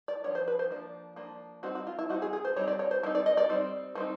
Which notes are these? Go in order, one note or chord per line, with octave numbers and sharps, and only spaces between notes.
D5
F3 A#3 D4 C#5
C5
B4
C5
F3 A#3 D4
F3 A#3 D4
G3 C4 D#4 F#4
F#4
F4
E4
G3 C4 D#4 F#4
G#4
G#4
C5
G3 C4 D#4 C#5
D5
C#5
C5
G3 C4 D#4 A#4
D5
D#5
D5
G3 C4 D#4
G3 C4 D#4